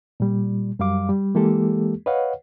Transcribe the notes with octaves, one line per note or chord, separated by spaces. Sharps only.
A#2 G3
F#2 G3 F5 D6
G3
E3 G#3 A#3 G4 A4
B4 C#5 D#5 F5 F#5